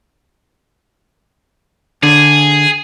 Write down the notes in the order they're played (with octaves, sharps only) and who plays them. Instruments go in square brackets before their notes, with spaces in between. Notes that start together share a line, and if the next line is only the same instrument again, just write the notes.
[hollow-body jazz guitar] D3 [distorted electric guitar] G#4